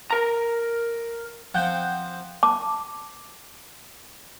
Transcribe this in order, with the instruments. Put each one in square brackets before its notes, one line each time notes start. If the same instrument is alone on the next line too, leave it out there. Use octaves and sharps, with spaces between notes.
[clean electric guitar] A#4 A#5
[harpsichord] F3 C4 [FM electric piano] F#5 G5 G6
[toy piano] A5 D6